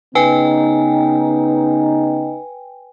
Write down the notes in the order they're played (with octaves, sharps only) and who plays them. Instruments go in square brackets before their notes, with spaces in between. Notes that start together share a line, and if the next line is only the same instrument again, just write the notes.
[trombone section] C#3 B3 D#4 [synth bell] B4 G5 G#5